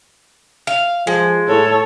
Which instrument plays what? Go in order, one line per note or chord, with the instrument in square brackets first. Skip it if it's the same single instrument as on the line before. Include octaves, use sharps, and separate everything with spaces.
[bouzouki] F5
[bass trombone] F3 [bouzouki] G#3
[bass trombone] A2 [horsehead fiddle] A4 C#5